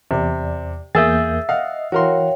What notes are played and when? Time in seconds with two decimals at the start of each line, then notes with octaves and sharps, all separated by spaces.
0.11 E2 C3 D5
0.95 E2 A#3 G#4 E5 E6 G6 A6
1.49 D#5 F5 F#5
1.92 E3 E4 F#4 A#4 C#5 F5 G5 C6